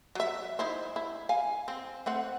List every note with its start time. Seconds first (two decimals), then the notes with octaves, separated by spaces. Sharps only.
0.15 F#3 E5
0.59 D#4 E4 C5
0.96 E4
1.29 F5 G#5
1.68 C4
2.06 A3 C4 F#5